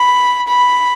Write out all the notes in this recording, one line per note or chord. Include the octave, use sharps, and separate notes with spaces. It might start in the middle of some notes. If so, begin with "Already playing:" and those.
Already playing: B5
B5